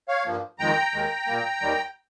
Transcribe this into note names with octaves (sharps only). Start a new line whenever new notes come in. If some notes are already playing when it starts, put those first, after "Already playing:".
C#5 F5
G2 F3 A#3
F2 D#3 G#3 G5 A#5
D#2 D#3 G#3
A#2 G3 A#3
D#2 D#3 G3